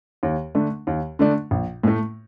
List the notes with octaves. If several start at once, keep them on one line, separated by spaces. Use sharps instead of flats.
D#2
D3 A3 D4
D#2
D3 A3 D4
A#1
A2 A3